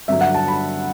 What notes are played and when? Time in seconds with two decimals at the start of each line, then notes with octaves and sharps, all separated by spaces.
0.08 G2 D3 F#3 E5
0.21 F#5
0.34 A5
0.48 B5